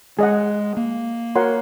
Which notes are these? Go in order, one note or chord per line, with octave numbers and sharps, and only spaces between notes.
G#3 G#4 D#5 F#5
A#3
F#4 A#4 C#5 F#5 C6